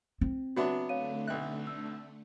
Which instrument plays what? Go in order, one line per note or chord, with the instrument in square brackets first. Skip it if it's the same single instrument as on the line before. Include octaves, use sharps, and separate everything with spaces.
[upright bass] C4
[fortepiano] F#3 B3 D4 [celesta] F#4 E5
[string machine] D3 A3 [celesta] C#5 F5 D#7
[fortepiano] B1 F#6 [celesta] E5
[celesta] E6